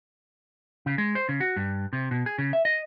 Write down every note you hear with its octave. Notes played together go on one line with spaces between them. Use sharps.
C#3
G#3
C5
C#3
F#4
G2
C3
B2
G#4
C#3
E5
D#5